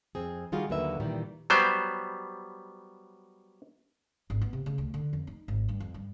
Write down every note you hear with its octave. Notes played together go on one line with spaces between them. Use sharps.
F2 C4 G#4
D#3 G3 F4 F#4 G#4
D#2 D3 F#3 A#3 B4 E5
A#2 D#3 E3 G3
F#3 G3 B3 C5
G#1
B3
C3
C#3
D2
D3
F2
D#4
G#1
G2
F2
G2